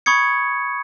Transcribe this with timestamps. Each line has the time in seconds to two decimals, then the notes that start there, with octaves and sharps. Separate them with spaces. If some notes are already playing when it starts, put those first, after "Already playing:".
0.06 B5 C#6 D#6 G#6 C#7